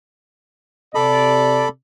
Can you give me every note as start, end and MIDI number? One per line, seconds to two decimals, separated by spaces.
0.95 1.67 48
0.95 1.69 69
0.95 1.67 74
0.95 1.69 83